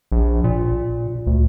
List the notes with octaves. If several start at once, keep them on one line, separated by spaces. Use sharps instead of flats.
A#1
A#2
D2